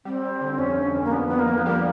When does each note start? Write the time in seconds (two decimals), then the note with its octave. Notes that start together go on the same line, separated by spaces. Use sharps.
0.05 G3 C4
0.23 G3
0.41 D3
0.58 F2 C#4
0.77 F2
0.95 F2
1.04 A#3
1.12 F2 B3
1.28 F2 B3
1.39 A#3
1.47 F2
1.58 B3
1.66 G3 A#3